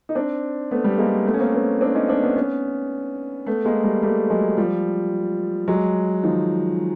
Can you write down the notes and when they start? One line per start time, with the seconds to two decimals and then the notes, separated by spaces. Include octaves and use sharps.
0.09 D#4
0.15 C4 D4
0.71 A3 B3
0.84 G3 A3
0.98 G#3 A#3
1.26 A3 B3
1.34 C#4
1.39 A#3 C4
1.54 B3 C#4
1.81 C4 D4
1.95 C#4 D#4
2.08 C4 D4
2.23 B3 C#4
2.36 B3 C#4
3.46 A3 B3
3.65 G#3 A#3
3.83 G3 A3
4.02 G3 A3
4.30 F#3 G#3
4.57 F3 G3
5.68 F#3 G#3
6.23 D#3 F3